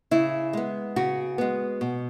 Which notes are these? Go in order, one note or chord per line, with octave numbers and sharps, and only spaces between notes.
C#3 E4
G#3 B3
C#3 F#4
G#3 B3
B2